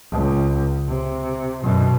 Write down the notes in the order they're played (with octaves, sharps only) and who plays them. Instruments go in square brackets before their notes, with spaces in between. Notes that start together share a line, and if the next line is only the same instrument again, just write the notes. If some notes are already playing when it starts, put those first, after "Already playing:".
[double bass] C#2
C3
F#2 B2